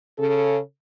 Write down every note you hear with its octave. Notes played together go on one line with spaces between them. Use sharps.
C#3 A4